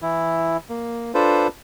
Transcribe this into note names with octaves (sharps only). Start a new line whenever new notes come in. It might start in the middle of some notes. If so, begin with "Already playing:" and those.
E3 E4
A#3
D4 F4 A4 B4 C5